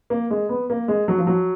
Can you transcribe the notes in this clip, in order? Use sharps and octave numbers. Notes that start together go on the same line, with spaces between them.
A#3
G#3
B3
A#3
G#3
F#3
F3
F#3